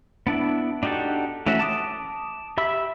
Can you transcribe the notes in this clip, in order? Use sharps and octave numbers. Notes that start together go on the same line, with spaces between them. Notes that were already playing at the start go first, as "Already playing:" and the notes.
B3 D4 E4
D4 D#4 F#4 G4 A4
E3 A3 C#4 F#4 E5
A5 D6 D#6
G4 E5 B5 E6